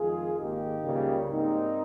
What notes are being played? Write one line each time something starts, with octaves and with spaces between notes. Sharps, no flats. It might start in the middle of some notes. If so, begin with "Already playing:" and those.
Already playing: F2 D#3 G#3 F4 G#4
G#1 G#2 D#3 A#3 D#4 G4
C#2 C#3 G3 A#3
G#2 G3 A#3 C4 D#4